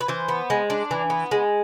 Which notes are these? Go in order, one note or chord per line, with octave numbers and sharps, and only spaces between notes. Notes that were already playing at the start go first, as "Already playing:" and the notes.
B4
E3 C5
B3
G#3
D4
E3
B3
G#3